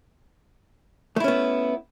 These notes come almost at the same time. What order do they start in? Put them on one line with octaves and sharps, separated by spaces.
A3 E4 C#4 B3